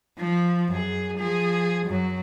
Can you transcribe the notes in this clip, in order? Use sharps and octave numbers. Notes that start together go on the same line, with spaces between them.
F3
F#2 G#4
F3 G#4
F#2 F#3